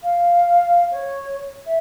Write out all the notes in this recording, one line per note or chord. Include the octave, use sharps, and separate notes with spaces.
F5
C#5
E5